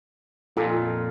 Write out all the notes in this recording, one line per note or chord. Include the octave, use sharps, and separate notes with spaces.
F2 A#2 F4 A4